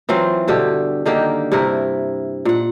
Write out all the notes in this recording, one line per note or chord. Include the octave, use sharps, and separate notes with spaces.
E3 F#3 C4 F4
G2 B2 D3 G4
D3 D#3 A#3 G4
G2 C3 E4 A#4
A#2 F#5